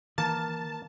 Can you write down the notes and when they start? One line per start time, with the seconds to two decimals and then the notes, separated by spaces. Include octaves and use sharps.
0.18 D#3 E3 A#3 A5